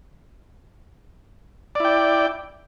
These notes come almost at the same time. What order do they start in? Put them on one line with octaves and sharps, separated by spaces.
D5 E4 G5